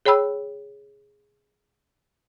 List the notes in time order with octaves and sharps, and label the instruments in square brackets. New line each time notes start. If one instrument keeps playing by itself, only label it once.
[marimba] G#4 C#5 G5 B5 E6